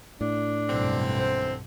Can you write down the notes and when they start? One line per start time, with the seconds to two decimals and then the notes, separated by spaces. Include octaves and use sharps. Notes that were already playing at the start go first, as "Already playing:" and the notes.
0.21 A2 D4
0.69 B1 G2 D3 E3 C4
1.20 C5